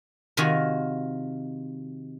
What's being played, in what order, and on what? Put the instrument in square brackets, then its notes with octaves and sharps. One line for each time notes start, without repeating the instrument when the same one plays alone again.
[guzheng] C3 D#3 F4 F#4 D#5 G#5